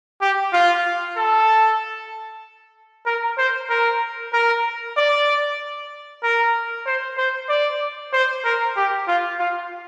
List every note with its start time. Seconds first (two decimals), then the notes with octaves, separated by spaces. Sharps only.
0.21 G4
0.53 F4
1.17 A4
3.06 A#4
3.38 C5
3.70 A#4
4.33 A#4
4.97 D5
6.23 A#4
6.86 C5
7.18 C5
7.49 D5
8.13 C5
8.45 A#4
8.77 G4
9.08 F4
9.39 F4